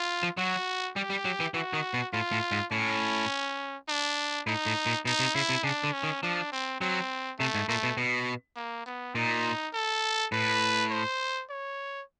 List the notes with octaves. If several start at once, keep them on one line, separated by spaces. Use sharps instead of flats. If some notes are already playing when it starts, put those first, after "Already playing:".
Already playing: F4
F3
F#3 F#4
G3 G4
G3
F#3
E3
E3 F#4
D#3
B2
A2 F4
A2
G#2
A2 C#4
D4
A2 D#4
A2
A#2
B2 D#4
C3
C#3 E4
C3
C#3 D4
D3
C#4
D#3
F3 D4
C4
F#3 C4
C3 A3
G#2
A#2 A3
B2
B2
A#3
B3
A#2 D#4
A4
A2 B4
C5
C#5